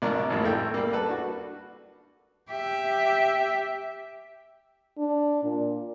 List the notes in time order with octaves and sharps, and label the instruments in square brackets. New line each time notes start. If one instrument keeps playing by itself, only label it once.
[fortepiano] A#1 B2 D4 A#4 C#6
G#1 F2 A2 G3 A#3
A1 A3 E5 G5
G3 A#3
A4 B4
D4 F#4
[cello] G4 E5
[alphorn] D4
A#2